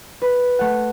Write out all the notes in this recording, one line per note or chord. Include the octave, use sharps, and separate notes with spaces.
B4
A3 F#5